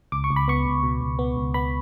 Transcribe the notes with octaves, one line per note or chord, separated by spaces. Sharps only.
C#2 D6
C#6
C#2
B5
B3 C#6
C#2
B2
C#2
B3
C#2
B3 B5